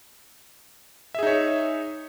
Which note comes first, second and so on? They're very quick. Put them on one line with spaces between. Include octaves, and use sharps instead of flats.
E5 G#4 D#4 C#5